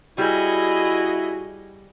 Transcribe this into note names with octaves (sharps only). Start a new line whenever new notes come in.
G3 E4 F#4 G#4 D#5